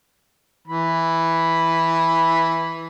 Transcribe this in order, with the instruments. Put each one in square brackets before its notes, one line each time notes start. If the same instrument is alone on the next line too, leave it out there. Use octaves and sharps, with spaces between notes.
[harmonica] E3 B5